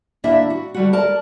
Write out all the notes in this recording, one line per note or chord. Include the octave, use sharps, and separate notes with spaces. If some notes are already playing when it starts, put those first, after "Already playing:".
D#2 A#3 D4 E4 E5
F#4
D3 G3 F#4
A#4 D5 A5